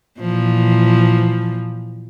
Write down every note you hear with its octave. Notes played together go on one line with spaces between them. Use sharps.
A#2 E3 F3